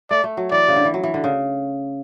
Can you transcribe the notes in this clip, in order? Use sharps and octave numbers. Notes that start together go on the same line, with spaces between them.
A3 D5
A3
F#3
E3 D5
C#3
D3
E3
F#3
E3
D3
C#3